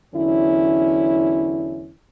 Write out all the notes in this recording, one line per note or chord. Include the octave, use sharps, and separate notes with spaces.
E2 D3 F#3 C#4 E4